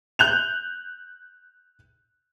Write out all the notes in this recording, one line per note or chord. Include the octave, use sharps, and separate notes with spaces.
F#6 G6 F7